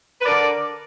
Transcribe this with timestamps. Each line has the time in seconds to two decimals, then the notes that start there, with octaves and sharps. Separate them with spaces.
0.20 B4
0.25 D3 A#4 D5